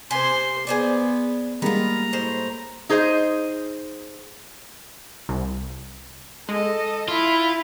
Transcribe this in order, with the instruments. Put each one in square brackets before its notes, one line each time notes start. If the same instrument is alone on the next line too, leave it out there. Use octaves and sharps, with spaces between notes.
[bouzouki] C3 G#5 [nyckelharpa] C5 C6
[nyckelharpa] B3 [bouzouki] G#4 C5 D5
[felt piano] G3 G#3 A#3 [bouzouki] B3 F4 [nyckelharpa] A#5
[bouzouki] A2 C5
[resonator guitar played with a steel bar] D#4 G#4 C5 C#5 D#5
[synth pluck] C2
[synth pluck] G#3 [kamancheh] A4 D#5
[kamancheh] E4 [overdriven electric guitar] F4